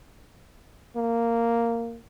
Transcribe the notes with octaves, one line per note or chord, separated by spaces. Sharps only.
A#3